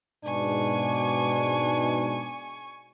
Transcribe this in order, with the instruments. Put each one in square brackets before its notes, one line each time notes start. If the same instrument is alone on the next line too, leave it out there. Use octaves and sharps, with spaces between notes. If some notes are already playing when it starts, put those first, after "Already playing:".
[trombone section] G#2 B2 [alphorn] D4 [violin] G#5 C#6